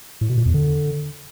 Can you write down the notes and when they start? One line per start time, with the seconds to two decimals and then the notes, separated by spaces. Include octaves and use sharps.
0.21 A2
0.29 B2
0.38 A#2
0.46 E2
0.54 D3